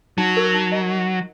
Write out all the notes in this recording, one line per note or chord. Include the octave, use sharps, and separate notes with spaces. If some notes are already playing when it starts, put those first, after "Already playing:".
F#3 D#4
A#4
D#4
D#5